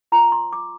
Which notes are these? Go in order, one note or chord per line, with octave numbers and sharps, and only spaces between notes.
F4 C5 A#5
C6
D6